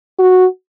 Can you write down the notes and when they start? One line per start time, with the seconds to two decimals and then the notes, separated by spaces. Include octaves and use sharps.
0.19 F#4